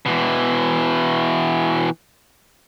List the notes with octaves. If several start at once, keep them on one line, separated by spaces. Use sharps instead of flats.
B2 E3